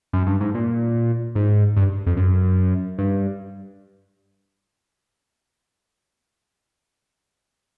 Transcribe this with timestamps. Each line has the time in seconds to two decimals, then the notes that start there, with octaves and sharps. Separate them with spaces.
0.13 F#2
0.27 G2
0.40 G#2
0.54 A#2
1.35 G#2
1.77 G2
2.06 F2
2.17 F#2
2.98 G2